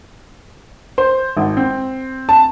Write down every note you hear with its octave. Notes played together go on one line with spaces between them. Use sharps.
C5
G#1
C4
A5